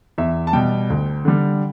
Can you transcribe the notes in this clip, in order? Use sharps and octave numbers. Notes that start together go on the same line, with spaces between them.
E2 E5
A5
B2 G3 G5
D2
D3 G3